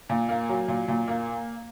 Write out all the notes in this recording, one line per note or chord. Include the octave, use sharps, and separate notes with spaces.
A#2
A#3
F#3
A#2
A#2
A#3